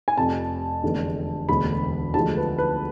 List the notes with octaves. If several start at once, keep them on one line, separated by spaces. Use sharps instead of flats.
G#5
F1 F2 C3 A5
F1 E2 D3 G#3
E1 D2 D3 G#3 B5
D2 D3 F3 G#3 A5
B4
B4